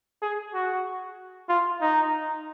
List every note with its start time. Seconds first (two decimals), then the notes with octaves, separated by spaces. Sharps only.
0.23 G#4
0.54 F#4
1.49 F4
1.81 D#4